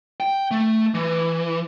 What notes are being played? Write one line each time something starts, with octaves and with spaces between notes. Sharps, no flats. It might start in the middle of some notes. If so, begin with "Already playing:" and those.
G5
A3
E3